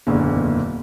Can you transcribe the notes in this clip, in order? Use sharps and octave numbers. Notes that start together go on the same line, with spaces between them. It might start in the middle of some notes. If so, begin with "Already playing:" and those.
F#1 E2 A#2 D3